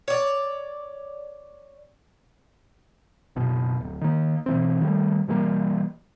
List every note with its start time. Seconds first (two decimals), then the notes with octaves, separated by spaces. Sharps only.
0.08 C#5 D5
3.36 F#1 B2
3.80 D1
4.01 D#3 A#3
4.46 B2 E3 C4
4.80 D#3 F#3 G3 A3
5.27 B2 E3 G3 A#3